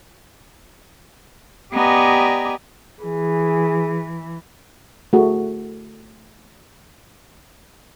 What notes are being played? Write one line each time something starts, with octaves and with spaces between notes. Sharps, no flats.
B3 G4 D5 D#5 G#5 A#5
E3 G#4
A3 F#4 G#4